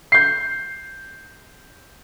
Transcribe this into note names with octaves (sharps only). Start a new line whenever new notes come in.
G6 C7